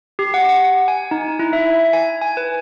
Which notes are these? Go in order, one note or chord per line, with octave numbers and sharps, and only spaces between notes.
G4
F#5
F#5
G#5
D#4
E4
E5
G#5
G#5
B4